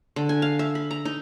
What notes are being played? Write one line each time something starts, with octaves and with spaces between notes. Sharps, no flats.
D3
G#5
F5
E5
B5
A#5
D#4